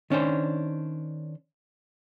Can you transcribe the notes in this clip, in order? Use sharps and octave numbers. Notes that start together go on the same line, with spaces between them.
D#3 C#4 D4 C5